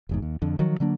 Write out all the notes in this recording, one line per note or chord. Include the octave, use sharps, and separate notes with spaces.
F1 E2 G#2
D#2
F2 D3
D#3 F3 F#3
D3 F#3 A#3 D4